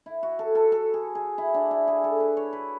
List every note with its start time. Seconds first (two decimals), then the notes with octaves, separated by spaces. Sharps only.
0.06 E4
0.23 F#4
0.39 A4
0.55 A4
0.72 A4
0.94 G#4
1.15 G#4
1.38 E4
1.54 D4
1.71 E4
1.88 G#4
2.04 A4
2.20 B4
2.37 C#5
2.53 B4